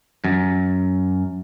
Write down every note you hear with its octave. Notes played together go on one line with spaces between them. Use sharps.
F#2